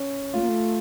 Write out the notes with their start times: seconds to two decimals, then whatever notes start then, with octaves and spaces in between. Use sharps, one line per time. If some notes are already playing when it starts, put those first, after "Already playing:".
Already playing: C#4
0.34 A3 F4
0.41 A#3
0.49 A3